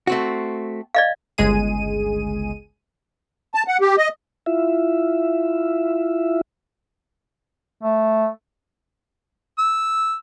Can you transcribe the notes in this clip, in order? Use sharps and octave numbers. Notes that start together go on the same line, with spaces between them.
A3 C4 F#4
D5 D#5 F5
G1 C#2 G#3 G#4 D#7
A5
F#5
G4
D#5
E4 F4 E5
A3
E6